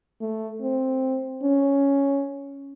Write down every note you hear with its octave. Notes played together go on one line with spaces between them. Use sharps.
A3
C4
C#4